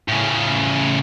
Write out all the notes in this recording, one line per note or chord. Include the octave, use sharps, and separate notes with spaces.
A2 C#3